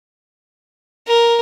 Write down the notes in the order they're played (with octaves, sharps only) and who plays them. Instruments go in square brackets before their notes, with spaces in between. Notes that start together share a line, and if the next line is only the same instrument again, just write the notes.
[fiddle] A#4